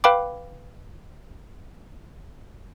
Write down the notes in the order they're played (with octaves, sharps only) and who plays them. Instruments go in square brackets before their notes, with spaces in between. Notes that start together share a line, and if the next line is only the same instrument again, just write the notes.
[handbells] B4 F5 G5 B5 D6